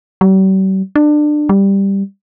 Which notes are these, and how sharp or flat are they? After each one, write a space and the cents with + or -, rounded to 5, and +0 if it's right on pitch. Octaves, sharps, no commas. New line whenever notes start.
G3 -45
D4 +25
G3 +5